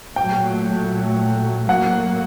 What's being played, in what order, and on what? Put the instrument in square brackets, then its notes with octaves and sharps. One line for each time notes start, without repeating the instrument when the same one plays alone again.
[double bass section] A#2 F#3 A3 [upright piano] G5
[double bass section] A2 F#3 A#3 [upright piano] F#5